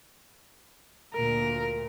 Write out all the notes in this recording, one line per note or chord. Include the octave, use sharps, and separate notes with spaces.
D2 A#2 A#4